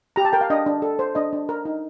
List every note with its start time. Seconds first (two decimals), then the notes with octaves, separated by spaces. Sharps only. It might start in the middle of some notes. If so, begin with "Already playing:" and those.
0.16 G4 A#5
0.25 A5
0.33 A#4 G5
0.41 F5
0.50 D4 D#5
0.66 D4
0.82 A4
0.99 C5
1.15 D4 D#5
1.33 D4
1.49 A#4
1.65 D#4